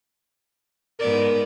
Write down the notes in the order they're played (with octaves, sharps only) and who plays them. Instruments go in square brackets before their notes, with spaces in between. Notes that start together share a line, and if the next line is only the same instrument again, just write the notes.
[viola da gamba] G#2 B3 D5 [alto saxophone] A#4